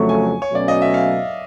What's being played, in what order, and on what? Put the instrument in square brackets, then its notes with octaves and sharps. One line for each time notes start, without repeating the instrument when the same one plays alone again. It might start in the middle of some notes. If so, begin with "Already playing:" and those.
Already playing: [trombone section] F2 C#3 F#3 A3 [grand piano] C#6
[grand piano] G#5
C#5
[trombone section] B2 F#3 A3 C#4 [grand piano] D5
[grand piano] D#5
E5
F5